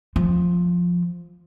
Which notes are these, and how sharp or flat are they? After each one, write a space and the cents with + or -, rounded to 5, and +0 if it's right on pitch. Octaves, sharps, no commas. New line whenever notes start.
F3 +10